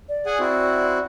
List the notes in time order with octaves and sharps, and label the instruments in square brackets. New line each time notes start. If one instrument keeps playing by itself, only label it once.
[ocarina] D5
[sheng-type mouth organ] G#4 F#5 G#5
C4 E4 F#4